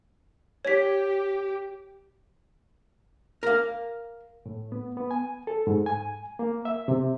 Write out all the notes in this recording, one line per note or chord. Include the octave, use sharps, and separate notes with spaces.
G4 C#5 B6
A#4 F5
A2
B3
B3
G#5
A4
G#2
G#5
A#3
E5
C3